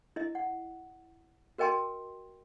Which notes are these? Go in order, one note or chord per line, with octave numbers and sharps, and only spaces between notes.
E4 D#5
F#5
F#4 A#4 D#5 G5 A5 C6